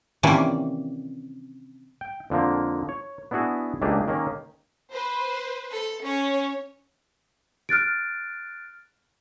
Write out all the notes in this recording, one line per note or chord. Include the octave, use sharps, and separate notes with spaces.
C3 D#3 E3 A#3 C#4 D5
G5
F2 D3 F3 A#3
C#5
B3 D4 E4 F#4 G#4
C#2 A3 A#3 D4 G4 G#4
D#3 A#3 C#4
B4 C5
A4
C#4 C#5
F6 F#6 A6 D7